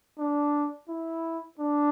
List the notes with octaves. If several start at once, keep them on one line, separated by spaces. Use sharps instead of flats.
D4
E4
D4